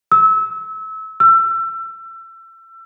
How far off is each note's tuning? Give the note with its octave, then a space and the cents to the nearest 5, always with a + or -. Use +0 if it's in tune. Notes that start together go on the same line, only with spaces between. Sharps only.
E6 -30
E6 +30